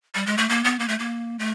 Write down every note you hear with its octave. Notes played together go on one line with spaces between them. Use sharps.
G3
G#3
A3
A#3
B3
A#3
A3
A#3
A3